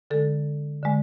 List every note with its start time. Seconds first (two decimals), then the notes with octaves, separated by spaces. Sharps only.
0.10 D3 G#3 A4
0.83 D3 G#3